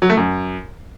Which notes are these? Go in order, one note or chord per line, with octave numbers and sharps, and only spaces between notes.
F#3
A3
F#2